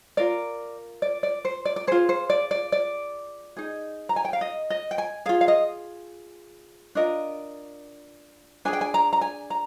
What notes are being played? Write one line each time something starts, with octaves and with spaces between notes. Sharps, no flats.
F4 A#4 D5
D5
D5
C5
D5
D5
F4 G#4 C5
C5
D5
D5
D5
D#4 G#4
A#5
G#5
G5
F5
D#5
D#5
G5
G#5
F4 G#4 F5
F5
D#5
D4 F4 A#4 D#5
D4 G#4 G#5
G5
G#5
A#5
A#5
G#5
A#5